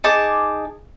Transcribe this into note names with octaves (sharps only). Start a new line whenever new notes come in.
D#4 G#4 A5 D6